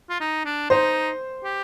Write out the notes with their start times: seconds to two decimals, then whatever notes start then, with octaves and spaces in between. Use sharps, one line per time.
0.09 F4
0.20 D#4
0.45 D4
0.70 D#4 C5
1.44 G4